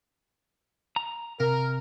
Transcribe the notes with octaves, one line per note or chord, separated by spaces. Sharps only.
A#5
C3 A#4